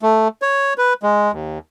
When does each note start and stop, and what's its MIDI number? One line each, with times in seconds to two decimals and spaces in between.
0.02 0.28 57
0.42 0.74 73
0.78 0.93 71
1.03 1.32 56
1.32 1.59 39